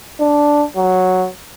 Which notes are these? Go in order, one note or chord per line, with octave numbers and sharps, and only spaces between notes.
D4
F#3